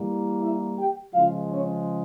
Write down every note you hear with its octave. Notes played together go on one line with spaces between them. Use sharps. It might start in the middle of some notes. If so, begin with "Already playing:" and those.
Already playing: E3 G3 A#3
E4 E5
G4 G5
C#3 F3 G#3 F4 F5
C#4 C#5